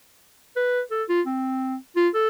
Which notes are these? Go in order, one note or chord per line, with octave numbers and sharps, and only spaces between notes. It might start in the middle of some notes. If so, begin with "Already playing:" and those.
B4
A4
F4
C4
F4
A4